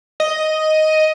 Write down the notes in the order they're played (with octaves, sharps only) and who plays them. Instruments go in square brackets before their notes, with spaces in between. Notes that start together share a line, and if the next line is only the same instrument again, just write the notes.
[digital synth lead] D#5